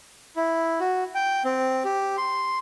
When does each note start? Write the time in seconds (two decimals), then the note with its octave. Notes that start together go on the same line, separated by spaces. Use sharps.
0.36 E4
0.80 F#4
1.15 G5
1.45 C4
1.85 G4
2.17 C6